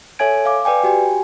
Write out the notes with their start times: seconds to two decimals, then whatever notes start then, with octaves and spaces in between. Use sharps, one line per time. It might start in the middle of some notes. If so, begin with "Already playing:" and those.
0.19 A4 C#5 E5 G#5 G#6 D7
0.45 F5 D6
0.65 B4 D5 G5 G#5
0.84 F#4 G4 G5 G#5